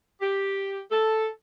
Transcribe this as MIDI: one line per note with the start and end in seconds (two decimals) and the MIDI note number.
0.20 0.80 67
0.90 1.27 69